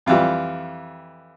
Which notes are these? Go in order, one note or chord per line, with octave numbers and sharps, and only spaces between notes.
F2 E3 G3 F4